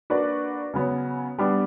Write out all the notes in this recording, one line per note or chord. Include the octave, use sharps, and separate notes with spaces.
A#3 D4 F#4 B4 D5
C#3 F#3 B3
G3 B3 D4